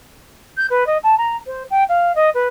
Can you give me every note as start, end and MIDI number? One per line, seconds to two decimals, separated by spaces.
0.57 0.67 91
0.70 0.87 71
0.87 0.98 75
1.03 1.18 81
1.18 1.37 82
1.47 1.63 72
1.70 1.84 79
1.89 2.15 77
2.15 2.30 75
2.34 2.48 71